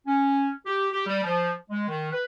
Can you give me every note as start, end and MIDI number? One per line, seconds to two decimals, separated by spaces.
0.07 0.49 61
0.66 0.88 67
0.92 1.04 67
1.07 1.21 55
1.23 1.52 53
1.70 1.84 56
1.88 2.09 51
2.12 2.25 71